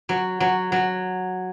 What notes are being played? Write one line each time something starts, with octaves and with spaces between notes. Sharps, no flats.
F#3
F#3
F#3